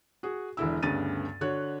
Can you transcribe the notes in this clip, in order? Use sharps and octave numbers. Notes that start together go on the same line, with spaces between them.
F#4 G#4
E1 D3 E4 E6
D2 G2 C#3 B3 A6 D#7
D3 F#4 C#5 F#6